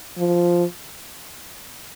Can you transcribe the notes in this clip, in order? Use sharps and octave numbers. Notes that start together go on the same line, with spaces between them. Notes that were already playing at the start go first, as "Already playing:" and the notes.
F3